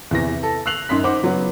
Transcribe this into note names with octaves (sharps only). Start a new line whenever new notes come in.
E2 C3 E3 A#6
A4
E6 F#6 C7 F7 F#7
F#2 D#4 C6 B6
D#4 C5 F#5 D6
C#3 F#3 B3